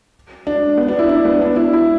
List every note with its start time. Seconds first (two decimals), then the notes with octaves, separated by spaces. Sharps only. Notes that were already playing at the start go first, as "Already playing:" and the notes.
0.47 D4
0.78 B3
0.88 D4
0.99 E4
1.09 D4
1.25 B3
1.42 D4
1.56 E4
1.73 E4